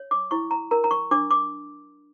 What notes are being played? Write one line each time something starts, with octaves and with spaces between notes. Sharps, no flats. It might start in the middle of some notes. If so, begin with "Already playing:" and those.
Already playing: C#5
D6
E4 C#6
A#5
A#4 A#5
A#5
C#6
D4 D6
D6